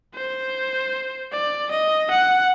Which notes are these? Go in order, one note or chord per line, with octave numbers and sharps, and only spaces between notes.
C5
D5
D#5
F#5